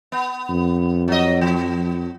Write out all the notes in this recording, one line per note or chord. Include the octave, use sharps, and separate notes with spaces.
B3
F2
F#3 D#5
F3